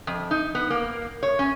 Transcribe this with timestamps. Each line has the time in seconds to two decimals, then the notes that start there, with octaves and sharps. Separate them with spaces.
0.07 F2
0.31 D#4
0.55 B3
0.70 A#3
1.23 C#5
1.39 C#4